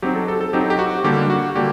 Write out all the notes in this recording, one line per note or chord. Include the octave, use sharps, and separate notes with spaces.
F#3 C4 D#4 G4
A4
A4
A4
F#3 C4 D#4 G4
G4
F#4
D3 G3 A#3 D4 G4
F#4
D3 G3 A#3 G4